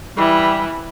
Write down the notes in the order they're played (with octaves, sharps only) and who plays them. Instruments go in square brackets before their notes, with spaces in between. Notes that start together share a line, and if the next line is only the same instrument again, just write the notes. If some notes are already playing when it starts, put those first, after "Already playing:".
[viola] E3 [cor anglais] G3